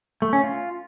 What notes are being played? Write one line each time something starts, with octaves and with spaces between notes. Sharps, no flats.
A3
C#4
F4